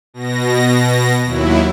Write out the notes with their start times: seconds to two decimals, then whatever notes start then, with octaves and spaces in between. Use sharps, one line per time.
0.14 B2 A#6
1.24 D#2 F#3 E4